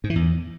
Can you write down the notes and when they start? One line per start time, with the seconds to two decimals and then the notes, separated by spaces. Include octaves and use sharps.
0.04 G#2
0.10 E3
0.16 E2